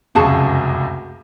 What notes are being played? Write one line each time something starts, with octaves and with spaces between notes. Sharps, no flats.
F1 C#2 F#2 F#4 G#4 A5